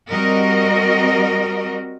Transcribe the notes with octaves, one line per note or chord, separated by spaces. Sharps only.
G3 C4 F#4 A#4 D#5